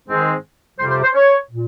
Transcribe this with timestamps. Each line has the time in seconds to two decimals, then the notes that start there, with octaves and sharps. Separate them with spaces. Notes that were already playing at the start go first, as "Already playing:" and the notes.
0.09 G#2 D#3 G#3 C4
0.79 F2 C3 G3 C5
0.91 C5
1.03 C5
1.15 C#5
1.51 A#2